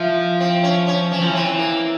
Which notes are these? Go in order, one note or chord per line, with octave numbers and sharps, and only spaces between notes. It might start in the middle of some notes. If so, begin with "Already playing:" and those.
Already playing: E3 F3
C4
C#4
C#4
E3 C#4
F3
E3 C4
A#3